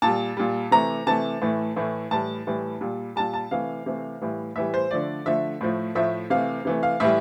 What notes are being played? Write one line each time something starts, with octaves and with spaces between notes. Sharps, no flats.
A#2 G3 A5
A#2 G3
C3 E3 A3 A#5
C3 E3 A3 A5
A2 E3 A3
A2 E3 A3
A2 E3 G3 A5
A2 E3 G3
A#2 G3
A#2 G3 A5
A5
C3 E3 A3 F5
C3 E3 A3
A2 E3 G3
A2 E3 G3 E5
C5
D3 F3 A3 D5
D3 F3 A3 E5
A2 F3 A3
A2 F3 A3 E5
C3 E3 A3 F5
C3 E3 A3
F5
A2 E3 G3 E5